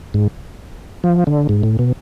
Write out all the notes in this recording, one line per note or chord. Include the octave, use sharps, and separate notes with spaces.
G#2
F3
D3
G#2
A2
B2